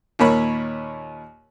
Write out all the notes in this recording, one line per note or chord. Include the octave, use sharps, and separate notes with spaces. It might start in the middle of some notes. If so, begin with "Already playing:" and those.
D#2 A#2 A#4 C#5 B5